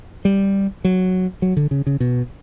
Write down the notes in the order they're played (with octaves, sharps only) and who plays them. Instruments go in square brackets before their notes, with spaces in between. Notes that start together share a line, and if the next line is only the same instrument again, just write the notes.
[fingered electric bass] G3
F#3
F#3
D3
C#3
C#3
B2